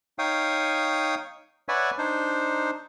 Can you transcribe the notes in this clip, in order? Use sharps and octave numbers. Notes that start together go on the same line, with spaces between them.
D#4 C#5 F5 G5 D#6
B4 C#5 D5 E5 F#5 G#5
D4 D#4 C5